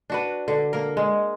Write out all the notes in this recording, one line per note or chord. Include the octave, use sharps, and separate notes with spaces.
D4 F#4 B4
D3
A#3 A#4
G#3